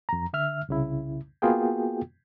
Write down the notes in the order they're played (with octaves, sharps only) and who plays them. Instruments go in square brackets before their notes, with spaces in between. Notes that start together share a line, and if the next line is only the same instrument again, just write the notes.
[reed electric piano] F2 A#5
D3 E5 F6
C2 C#3 E4
A#3 B3 F4 F#4 G#4 G5